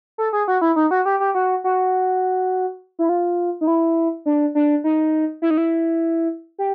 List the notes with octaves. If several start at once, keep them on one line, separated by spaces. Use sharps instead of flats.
A4
G#4
F#4
E4
D#4
F#4
G4
G4
F#4
F#4
E4
F4
D#4
E4
D4
D4
D#4
E4
D#4
E4
G4